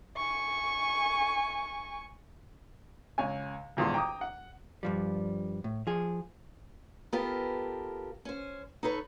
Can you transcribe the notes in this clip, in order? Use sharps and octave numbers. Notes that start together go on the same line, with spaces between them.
G#5 C#6
C#2 C#5 G#5
D#1 E2 G#2 F4 C6
G5 A#5 D6 D#6
F#5
G2 F3 G3
A2
F3 G#4
B3 F4 G4 A4 A#4
C#4 C5
D#4 A4 B4 C#5